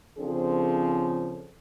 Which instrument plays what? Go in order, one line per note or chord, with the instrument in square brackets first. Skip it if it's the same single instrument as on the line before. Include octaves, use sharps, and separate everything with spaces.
[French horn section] C#3 F3 C4 D4 G#4 A4